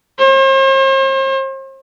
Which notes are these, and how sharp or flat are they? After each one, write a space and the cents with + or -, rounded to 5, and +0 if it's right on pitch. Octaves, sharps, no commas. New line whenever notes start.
C5 +45